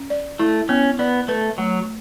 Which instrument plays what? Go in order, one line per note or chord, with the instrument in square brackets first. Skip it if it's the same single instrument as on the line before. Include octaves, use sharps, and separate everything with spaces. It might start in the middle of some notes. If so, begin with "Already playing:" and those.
Already playing: [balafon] C#4
D5
[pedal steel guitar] A3 [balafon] E4
[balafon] B3 [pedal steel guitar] C#4
[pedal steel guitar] B3 [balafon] D5
[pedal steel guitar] A3 [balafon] B4
[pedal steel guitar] F#3 [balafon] A3